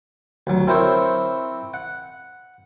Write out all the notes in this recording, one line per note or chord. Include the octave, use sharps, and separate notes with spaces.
D2 F#3
C4 E4 A#4 C5 C#5
F#5